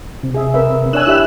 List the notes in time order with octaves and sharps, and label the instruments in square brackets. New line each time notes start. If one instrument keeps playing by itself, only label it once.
[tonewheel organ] C3
[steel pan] G#4 E5
A#4 B4 E5
[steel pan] D4 C#5 G#5 [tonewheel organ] E6 F#6
[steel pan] E4 G4 E5